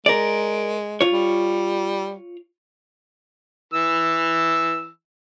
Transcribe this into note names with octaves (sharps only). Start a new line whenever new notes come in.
G#3 A#4 D5
F4 C#5
G3
E3 E6